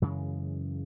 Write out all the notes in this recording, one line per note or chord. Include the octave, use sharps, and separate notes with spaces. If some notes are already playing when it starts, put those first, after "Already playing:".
F#2 C#3 E3 G#3